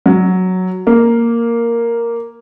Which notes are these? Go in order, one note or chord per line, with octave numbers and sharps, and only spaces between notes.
F#3
A#3